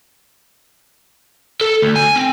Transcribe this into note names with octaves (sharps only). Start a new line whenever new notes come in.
A4
D2
G#5
C4